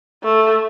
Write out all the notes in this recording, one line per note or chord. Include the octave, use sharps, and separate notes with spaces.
A3